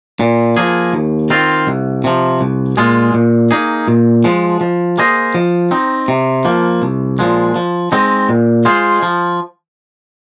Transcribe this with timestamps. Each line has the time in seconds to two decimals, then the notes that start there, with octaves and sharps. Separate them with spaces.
0.20 A#2
0.57 F3 A#3 G#4
0.93 D#2
1.30 D#3 C4 F4
1.67 C2
2.04 C3 F3
2.41 C2
2.77 A#2 G#3 F4 G#4
3.14 A#2
3.51 A#3 D#4 G#4
3.88 A#2
4.24 F3 G#3
4.61 F3
4.98 A#3 G#4 C5 D#5
5.35 F3
5.71 C4 D#4
6.08 C3
6.45 F3 A#3
6.82 C2
7.19 A#2 F3 G#3
7.56 F3
7.92 G#3 C4 D#4
8.29 A#2
8.65 G#3 F4 G#4 C5
9.03 F3